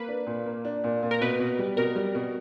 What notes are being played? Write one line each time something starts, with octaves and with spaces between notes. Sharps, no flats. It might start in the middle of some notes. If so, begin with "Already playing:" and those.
Already playing: A#3 B4
D4
A#2
A#3
D4
A#2
A#2
A#4
B2 B4
B2
G3
B2 A#4
G3
B2